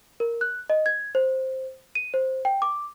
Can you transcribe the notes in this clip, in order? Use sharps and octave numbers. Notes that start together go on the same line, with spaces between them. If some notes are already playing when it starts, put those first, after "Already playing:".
A#4
F#6
D#5
G#6
C5
D#7
C5
G5
D6